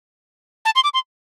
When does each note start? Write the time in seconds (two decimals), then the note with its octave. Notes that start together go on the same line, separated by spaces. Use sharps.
0.65 A5
0.75 C6
0.84 D6
0.94 C6